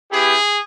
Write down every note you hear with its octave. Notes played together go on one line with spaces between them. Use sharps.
B3 E4 G4 G#4